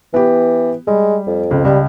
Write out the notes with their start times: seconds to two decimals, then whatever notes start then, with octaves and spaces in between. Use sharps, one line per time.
0.14 E3 B3 G4
0.87 G3 G#3
1.27 F2
1.51 C#2
1.65 C#2 G3